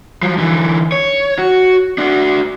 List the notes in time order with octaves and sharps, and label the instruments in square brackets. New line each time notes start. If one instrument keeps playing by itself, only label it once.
[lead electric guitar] F3 F#3
D3 E3
C#5
F#4
D4 F#4